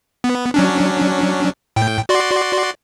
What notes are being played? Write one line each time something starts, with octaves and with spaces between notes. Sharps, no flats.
B3
F#3 C#4 D4
A2 G5
F#4 D5 C6